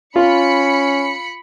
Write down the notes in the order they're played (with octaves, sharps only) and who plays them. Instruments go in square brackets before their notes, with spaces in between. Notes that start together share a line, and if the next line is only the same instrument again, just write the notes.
[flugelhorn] C#4 [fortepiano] F4 [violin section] B5 C#7